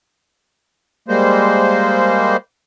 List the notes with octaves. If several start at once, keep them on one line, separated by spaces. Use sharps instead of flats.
G3 G#3 A#3 C5